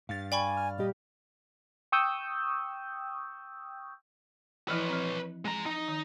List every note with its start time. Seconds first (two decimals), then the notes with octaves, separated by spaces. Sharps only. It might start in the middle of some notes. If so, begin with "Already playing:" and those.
0.09 G2 F5 A6
0.32 D5 G5 G#5 B5 C#6
0.57 F6
0.78 A#2 G3 G4 D#5
1.92 G5 C#6 D#6 E6 G6
4.68 E3 F3 E4 B4 C#5
4.89 F3 C4
5.45 G#3 A#5
5.66 D#4
5.88 D#3